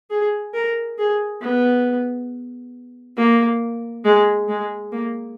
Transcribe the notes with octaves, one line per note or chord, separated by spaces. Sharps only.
G#4
A#4
G#4
B3
A#3
G#3
G#3
A#3